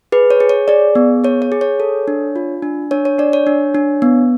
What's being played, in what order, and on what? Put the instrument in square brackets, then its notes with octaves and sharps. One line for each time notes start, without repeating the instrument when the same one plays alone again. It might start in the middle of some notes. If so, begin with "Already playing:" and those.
[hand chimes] G#4 B4
C#5
G#4
C#5
G#4 D5
B3
G#4 C#5
C#5
G#4
C#5
A4
D4
F4
D4
D4 C#5
C#5
D4 D5
C#5
D4
D4
B3